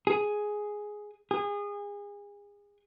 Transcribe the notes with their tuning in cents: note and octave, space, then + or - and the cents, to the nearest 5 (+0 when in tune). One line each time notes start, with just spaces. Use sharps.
G#4 +5
G#4 -30